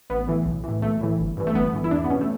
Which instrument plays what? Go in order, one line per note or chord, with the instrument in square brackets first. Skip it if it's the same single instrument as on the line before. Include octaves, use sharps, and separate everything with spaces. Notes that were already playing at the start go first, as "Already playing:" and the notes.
[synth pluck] A1 B3
A2 E3
B1
A2 E3
B1 A3
A2 E3
G1
G2 E3
A3
G1 B3
G2 E3
E4
E2 D4
B3
B2 C#4
A3